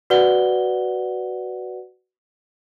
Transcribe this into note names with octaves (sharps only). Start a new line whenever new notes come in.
F#4 B4 D5 F#5 G7